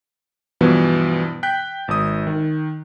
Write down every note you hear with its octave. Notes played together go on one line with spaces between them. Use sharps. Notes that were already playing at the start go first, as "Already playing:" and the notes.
G2 B2 E3 F3 B3
G5 F#6 G6 B6
G#1 D#6
D#3